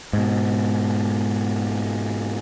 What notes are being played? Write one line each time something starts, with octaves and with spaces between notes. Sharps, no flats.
G#2 B2